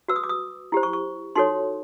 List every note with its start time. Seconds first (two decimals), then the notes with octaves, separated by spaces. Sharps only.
0.08 F#4 B4 E6
0.16 D#6
0.23 D6
0.29 D#6
0.72 E4 G4 C5
0.83 C#6
0.93 C#6
1.35 D#4 F#4 A4 C#5 C6